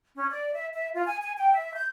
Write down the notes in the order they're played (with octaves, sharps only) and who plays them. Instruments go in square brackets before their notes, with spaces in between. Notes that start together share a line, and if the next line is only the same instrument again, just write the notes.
[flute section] C#4
D5
E5
E5
F4
G#5
G#5
G5
E5
G6